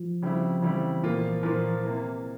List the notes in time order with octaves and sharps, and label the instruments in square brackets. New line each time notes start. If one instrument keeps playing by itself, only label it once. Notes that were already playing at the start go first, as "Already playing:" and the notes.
Already playing: [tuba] F3
[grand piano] C#3 G3 C4 E4
[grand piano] C#3 G3 C4 E4 [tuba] E3
[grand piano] A#2 F3 A#3 F4
A#2 F3 A#3 F4
C3 E3 A#3